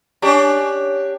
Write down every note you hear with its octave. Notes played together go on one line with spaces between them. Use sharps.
C#4 D4 G4